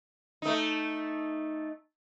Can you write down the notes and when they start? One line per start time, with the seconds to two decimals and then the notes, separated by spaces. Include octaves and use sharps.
0.42 A3 D#4